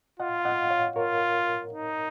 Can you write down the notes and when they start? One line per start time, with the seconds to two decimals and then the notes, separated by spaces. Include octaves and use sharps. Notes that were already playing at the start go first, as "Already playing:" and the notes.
0.20 F4 D#5 F#5
0.40 F5
0.45 D#5 F#5
0.70 C#5 F5
0.96 F4 A#4 C#5
1.73 D#4